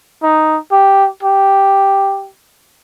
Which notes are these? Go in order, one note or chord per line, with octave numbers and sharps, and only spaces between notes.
D#4
G4
G4